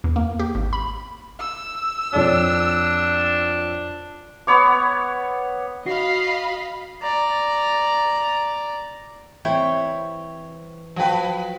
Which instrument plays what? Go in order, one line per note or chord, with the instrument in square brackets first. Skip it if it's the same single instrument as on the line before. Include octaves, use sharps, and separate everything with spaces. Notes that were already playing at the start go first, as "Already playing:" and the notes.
[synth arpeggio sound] E2
A#3
G4
G#1
B5
[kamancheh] E6
[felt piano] F2 C#5 D5 [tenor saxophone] D4
[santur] B3 C#5 D6
[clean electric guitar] F#4 [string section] D#5 F5 B5 [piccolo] C7
[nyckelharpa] D5 A#5
[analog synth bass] E3 [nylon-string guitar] G3 C4 [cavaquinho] E4 C#5 G5
[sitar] F3 B4 [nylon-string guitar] F#3 G5